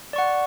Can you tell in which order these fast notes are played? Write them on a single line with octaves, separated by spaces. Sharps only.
D5 C#6 F#5